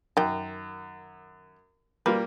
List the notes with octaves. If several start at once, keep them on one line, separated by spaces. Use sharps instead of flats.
F#2 D#3 G5
G3 A#3 F4 B4